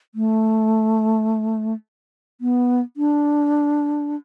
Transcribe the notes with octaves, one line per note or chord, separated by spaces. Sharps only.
A3
B3
D4